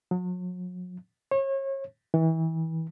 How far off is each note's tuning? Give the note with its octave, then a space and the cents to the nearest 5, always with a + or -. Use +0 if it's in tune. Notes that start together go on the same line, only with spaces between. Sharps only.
F#3 -40
C#5 -35
E3 -30